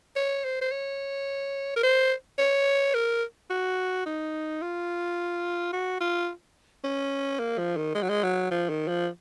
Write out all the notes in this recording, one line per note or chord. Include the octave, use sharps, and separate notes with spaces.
C#5
C5
C5
C#5
A#4
C5
C#5
A#4
F#4
D#4
F4
F#4
F4
C#4
A#3
F3
D#3
G#3
F#3
G#3
F#3
F3
D#3
F3